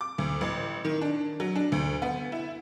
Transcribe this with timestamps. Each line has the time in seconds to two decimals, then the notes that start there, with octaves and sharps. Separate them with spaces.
0.01 D6
0.18 D2
0.41 A1
0.85 D#3
1.01 D4
1.40 F#3
1.56 D4
1.72 D2
2.02 B3
2.32 E4